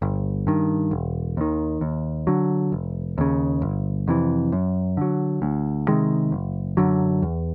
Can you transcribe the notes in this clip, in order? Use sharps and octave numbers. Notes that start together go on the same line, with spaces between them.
G1
G2 D#3
E1
D#2 D#3
D#2
D3 F#3
F1
D#2 C#3
G1
F2 C3 E3
F#2
D3 F#3
D2
C3 D#3 G#3
F#1
F#2 D3 F#3
E2